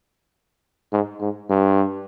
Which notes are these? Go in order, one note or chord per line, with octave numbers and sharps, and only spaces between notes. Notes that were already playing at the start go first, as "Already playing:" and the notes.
G#2
G#2
G2